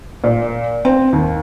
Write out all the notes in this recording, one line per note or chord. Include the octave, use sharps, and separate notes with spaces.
A#2
C4
D#2